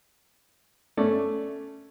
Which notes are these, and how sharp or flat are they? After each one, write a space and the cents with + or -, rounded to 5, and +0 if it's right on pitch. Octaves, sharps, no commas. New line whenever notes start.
A3 +0 C#4 +0 D5 +0